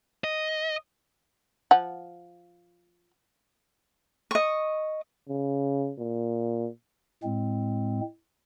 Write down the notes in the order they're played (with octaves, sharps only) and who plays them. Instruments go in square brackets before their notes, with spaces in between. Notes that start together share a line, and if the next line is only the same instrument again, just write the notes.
[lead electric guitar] D#5
[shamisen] F3 F#5
[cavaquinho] D#5 C#6
[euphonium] C#3
A#2
[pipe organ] A2 G#3 C4